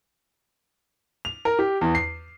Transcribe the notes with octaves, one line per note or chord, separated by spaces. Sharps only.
F7
A#4
G4
E2
C7